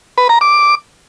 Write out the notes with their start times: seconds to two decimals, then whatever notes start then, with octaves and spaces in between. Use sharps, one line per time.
0.18 B4
0.29 A#5
0.41 D6